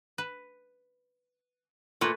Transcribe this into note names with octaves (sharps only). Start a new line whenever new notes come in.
B4
A#2 A3 B4